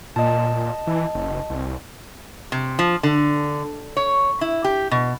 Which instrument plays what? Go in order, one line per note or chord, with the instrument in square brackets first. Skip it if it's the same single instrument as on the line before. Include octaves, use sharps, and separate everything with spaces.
[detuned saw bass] A#2 [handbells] D#5 A5
[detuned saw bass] E3
F#1
C2
[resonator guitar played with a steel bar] C3
F3
D3
C#5
E4
G4
B2